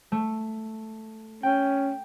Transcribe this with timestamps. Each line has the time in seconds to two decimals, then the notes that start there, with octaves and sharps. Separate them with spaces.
0.12 A3
1.43 C#4 G5